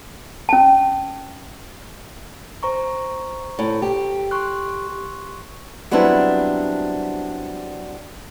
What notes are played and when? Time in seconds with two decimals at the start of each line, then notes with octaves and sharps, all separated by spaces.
0.49 C#4 A5
2.63 C5 A#5 C#6
3.59 A2
3.82 G4
4.31 C6 C#6 F#6
5.91 F#3 G3 B3 C4 D4 E4